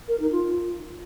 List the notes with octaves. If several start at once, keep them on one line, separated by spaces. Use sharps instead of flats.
A#4
D#4
F4